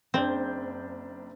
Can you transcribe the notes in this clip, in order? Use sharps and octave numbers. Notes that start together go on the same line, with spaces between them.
F#1 C4 D4 G6